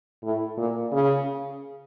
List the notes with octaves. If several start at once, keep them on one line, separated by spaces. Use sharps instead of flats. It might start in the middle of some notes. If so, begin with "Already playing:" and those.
A2
A#2
C#3